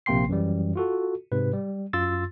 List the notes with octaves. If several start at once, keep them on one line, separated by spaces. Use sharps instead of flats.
A#1 C3 A#3 G5 C6 C7
F#2 E3 G3
F4 F#4 A4
G#2 C3 B4
G3
F#2 F4 C6 E6 A6